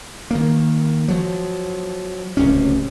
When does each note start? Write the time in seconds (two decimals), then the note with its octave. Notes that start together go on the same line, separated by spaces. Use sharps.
0.31 D#3 A#3
1.08 F3 F#3
2.37 D1 C#2 C3 C#4